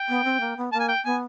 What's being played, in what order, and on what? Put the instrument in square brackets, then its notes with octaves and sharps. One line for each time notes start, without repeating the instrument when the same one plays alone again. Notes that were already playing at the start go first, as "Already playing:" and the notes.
Already playing: [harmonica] G5
[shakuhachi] B3
C4
A#3
B3
[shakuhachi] A#3 [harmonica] A5
[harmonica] G#5
G5
[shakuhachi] B3 [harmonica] G#5